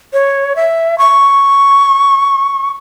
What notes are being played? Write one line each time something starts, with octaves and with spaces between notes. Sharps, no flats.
C#5
E5
C#6